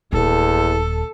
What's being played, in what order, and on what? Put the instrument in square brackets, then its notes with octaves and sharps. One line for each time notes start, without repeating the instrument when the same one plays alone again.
[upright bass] D#1 [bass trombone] E2 [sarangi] A4